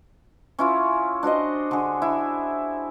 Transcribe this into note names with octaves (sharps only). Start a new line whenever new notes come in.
C#4 E4 F4
D4 F#4 C5 D#5
D3 G#4
E4